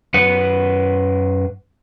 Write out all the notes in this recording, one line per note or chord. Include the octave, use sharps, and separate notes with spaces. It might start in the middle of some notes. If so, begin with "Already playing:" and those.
F#2 B4 F#5